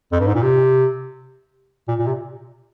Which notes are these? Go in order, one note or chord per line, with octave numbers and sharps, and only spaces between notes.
F2
G2
G#2
A#2
C3
A#2
A#2
C3